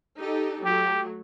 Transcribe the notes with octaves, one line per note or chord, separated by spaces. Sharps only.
D#4 G4 A4
F#3 A3 G4